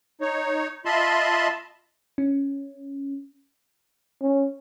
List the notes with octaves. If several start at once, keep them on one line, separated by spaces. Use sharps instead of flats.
D#4 C#5
F4 D#5 E5 A5 B5 C6
C#4
C#4